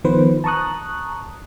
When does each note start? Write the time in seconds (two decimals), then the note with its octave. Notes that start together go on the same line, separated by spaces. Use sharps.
0.04 D#3 F3 B3 B4 C5
0.44 A5 A#5 C#6 D#6 F#6